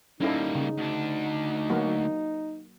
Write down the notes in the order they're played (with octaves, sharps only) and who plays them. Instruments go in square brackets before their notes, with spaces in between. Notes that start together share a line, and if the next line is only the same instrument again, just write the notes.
[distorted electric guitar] G3 A#3 [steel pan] C#4 E4 A4 [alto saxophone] D#4
[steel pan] C#3
[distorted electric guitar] D2 D4
[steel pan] F#3 A#3 F#4